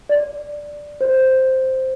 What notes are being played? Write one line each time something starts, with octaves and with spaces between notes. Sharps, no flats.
D5
C5